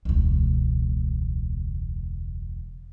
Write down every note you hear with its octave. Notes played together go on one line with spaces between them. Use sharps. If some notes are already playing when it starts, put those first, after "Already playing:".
E1 C#2